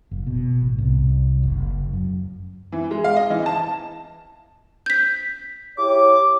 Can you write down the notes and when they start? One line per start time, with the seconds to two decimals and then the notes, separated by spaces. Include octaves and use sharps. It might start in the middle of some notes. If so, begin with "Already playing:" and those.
0.11 F#1
0.27 B2
0.62 A1
0.78 C2
1.43 F#1
1.93 F#2
2.72 E3
2.91 G#3
3.04 F5
3.16 D#5
3.30 E3
3.46 A5
4.86 G6 B6
5.78 E4 G4 C#5 D6